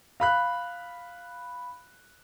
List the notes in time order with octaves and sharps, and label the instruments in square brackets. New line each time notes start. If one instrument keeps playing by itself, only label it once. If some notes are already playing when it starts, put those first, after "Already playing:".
[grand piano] F5 B5 F#6